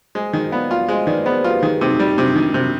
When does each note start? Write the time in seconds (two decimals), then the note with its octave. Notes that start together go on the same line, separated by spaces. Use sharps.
0.15 G#3 G#4 C5
0.33 D#3 C5 D#5
0.52 B3 D5 F5
0.71 F4
0.88 G#3 C5 D#5
1.07 D#3 B4 D5
1.26 B3 G#4 C5
1.44 F4 G4 B4
1.63 D#3 G#4
1.81 C3 D#4
1.99 G3 D#4
2.17 C3 D4
2.36 D#3 D4
2.54 C3